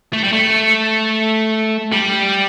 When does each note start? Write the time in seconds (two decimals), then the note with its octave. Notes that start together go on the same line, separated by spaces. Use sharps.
0.13 A3
0.24 G3
0.33 A3
1.92 G3